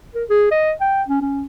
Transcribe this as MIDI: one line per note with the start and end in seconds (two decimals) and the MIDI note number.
0.15 0.24 70
0.29 0.48 68
0.51 0.72 75
0.81 1.03 79
1.08 1.21 61
1.22 1.44 61